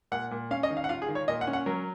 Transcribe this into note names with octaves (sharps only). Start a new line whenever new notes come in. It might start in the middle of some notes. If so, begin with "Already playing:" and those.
A#2 F#5
A#2
C#4 F5
D#5
D#3
F5
F#5
F4 F5
G#4
D#3
C#5
A#2 D#5
F#5
C#4
F#5
F#3 A#4